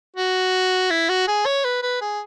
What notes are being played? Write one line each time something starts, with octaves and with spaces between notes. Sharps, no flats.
F#4
E4
F#4
G#4
C#5
B4
B4
G#4